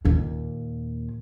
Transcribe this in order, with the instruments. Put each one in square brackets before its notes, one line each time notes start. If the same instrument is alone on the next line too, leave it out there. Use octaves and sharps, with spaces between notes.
[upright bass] D#2 A#2